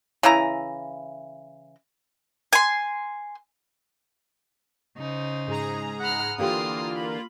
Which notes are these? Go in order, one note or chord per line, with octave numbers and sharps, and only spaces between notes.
C#3 E3 E4 A#5
G#5 C6
C#3 D#4 C5
G#2 G#4 A#5
F#5 B5 F6
D3 E3 A#3 F4 G4 D#6 F6
B5